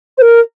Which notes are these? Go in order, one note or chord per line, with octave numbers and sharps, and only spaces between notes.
C5
A#4